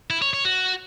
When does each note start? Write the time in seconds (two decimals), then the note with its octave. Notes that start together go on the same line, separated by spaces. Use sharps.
0.10 E4
0.22 C#5
0.33 C#5
0.45 F#4